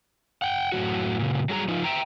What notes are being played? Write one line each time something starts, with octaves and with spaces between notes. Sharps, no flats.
F#5 G5
F#2 A2 E3 F#4
A#2 C#3
F#3 G3 G#4 A5 A#5
F3 D#4 F4
E5 G5 A#5